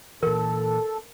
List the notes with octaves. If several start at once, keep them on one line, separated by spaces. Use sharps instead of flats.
A#2 E3 A4 A#4